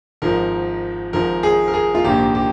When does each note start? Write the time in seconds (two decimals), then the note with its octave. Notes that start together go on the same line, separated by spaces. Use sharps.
0.22 G#1 G#2 F3 A#4
1.13 G#1 G#2 F3 A#4
1.43 G#4
1.68 A#4
1.74 G#4
1.95 F4
2.04 A#1 G#2 D#3 A#3 G4
2.35 G4